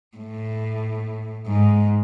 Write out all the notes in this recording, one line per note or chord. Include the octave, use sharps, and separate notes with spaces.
A2
G#2